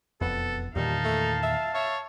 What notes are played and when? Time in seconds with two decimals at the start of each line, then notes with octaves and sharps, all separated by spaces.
0.21 E1 F2 B3 A4
0.76 E2 A#2 D#3 G3 D#4 F5 A5
1.04 A3
1.43 E5
1.75 C#5 E5